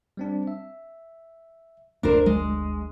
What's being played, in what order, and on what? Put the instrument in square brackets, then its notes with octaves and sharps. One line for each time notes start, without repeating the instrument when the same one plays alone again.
[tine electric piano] G3 C4 D4
E5
[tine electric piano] G1 D2 [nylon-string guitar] D4 A#4 C5
[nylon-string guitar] G#3